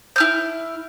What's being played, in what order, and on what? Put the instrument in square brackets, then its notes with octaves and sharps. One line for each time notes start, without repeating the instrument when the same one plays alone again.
[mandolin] E4 F6 G6